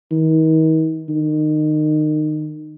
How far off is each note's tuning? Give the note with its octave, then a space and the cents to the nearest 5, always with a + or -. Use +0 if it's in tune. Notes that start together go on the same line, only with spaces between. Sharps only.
D#3 +40
D#3 -25